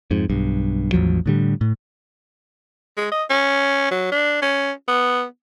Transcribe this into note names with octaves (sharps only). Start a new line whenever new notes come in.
F2 G#2
B1 G2
A1 E2 F3 F#3
A2 D3 G3
A2
G#3
D#5
C#4
F#3
D4
C#4
B3